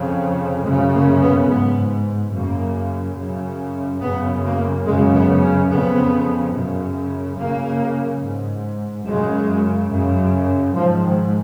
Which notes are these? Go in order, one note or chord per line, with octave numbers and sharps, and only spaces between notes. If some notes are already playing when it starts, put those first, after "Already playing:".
Already playing: F2 C#3
F#2 C#3 G#3
A#3
B3
G#2 B3
F#2 C#3 A#3
F#2 C#3
F#2 C#3 B3
A#3
F#2 C#3 G#3
B3
C#4
F2 C#3 B3
F#2 C#3
F#2 C#3 A#3
G#2
F#2 C#3 G#3
F#2 C#3
G#2 F3
D#3